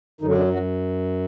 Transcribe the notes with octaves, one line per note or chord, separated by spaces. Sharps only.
F#2 D3 D#3 F#3 D#4
D3 D4
F#3 F#4